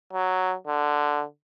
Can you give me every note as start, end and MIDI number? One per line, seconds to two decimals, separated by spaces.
0.13 0.55 54
0.67 1.24 50